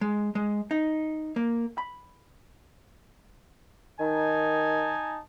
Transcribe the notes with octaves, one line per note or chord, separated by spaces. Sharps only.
G#3
G#3
D#4
A#3
B5
D#3 D#4 G#5 A5